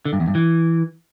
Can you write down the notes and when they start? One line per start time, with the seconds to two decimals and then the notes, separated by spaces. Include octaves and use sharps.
0.05 D3
0.13 G2
0.20 E2
0.28 G2
0.35 E3